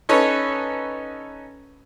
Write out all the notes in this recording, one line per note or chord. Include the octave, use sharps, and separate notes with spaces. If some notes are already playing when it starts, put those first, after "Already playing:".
C#4 D#4 A4 B4 C#5